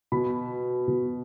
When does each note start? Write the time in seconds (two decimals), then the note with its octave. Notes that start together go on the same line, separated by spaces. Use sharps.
0.12 B2 B5
0.88 B2